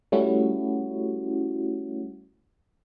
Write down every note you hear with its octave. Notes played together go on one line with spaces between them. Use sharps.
G3 A3 C#4 E4 F#4